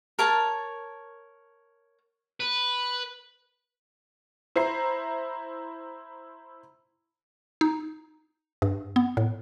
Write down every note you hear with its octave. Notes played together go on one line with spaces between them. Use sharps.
A#4 C#5 A5
B4
E4 C5 A#5 C7
D#4
G2
B3
A2